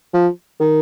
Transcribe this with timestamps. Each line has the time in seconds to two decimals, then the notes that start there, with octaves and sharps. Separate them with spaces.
0.14 F3
0.60 D#3